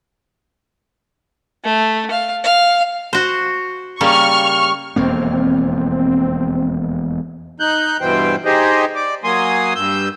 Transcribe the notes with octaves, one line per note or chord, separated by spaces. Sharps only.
A3
F5
F5
F#4 C5
C#3 G3 A#3 C#6 F6
E1 F2 A#3 C4
D#4 F#6 G6
G2 B2 E3 C5 G5
D#4 G4 G#4 C5 D#5
D5
F#3 A#3 G#5 C6 D#6
G2 E6 G6